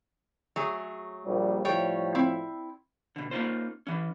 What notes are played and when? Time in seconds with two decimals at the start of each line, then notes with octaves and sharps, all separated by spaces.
0.56 F#3 A3 G#4
1.25 A#1 A#2 G3
1.65 A2 F3 G3 A3 C#5 G5
2.15 C4 E4
3.16 B2 D3
3.31 A#3 C#4 D#4 F4 C5
3.87 E3 C#4